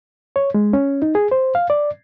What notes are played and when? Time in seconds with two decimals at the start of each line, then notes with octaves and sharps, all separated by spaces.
0.36 C#5
0.54 G#3
0.73 C#4
1.02 D#4
1.15 G#4
1.31 C5
1.55 F5
1.70 D5